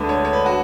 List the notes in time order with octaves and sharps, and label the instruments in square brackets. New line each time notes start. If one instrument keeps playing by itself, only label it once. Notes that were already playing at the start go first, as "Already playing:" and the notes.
Already playing: [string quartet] D2 D3 G#3 [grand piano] B4
[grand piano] C#5
C#5
B4
F#4